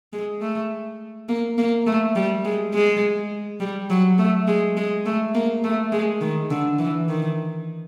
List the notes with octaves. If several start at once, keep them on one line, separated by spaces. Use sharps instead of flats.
G#3
A3
A#3
A#3
A3
G3
G#3
G#3
G3
F#3
A3
G#3
G#3
A3
A#3
A3
G#3
D#3
D3
E3
D#3